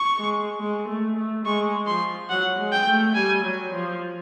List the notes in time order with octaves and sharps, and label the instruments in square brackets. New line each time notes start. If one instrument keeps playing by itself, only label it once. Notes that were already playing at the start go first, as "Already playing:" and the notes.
Already playing: [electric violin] C#6
[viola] G#3
G#3
A3
A3
[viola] G#3 [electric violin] C#6
[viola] F3 [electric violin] C6
[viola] F#3 [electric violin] F#5
[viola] G#3
[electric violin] G5
[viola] A3
[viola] G3 [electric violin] G#5
[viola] F#3
F3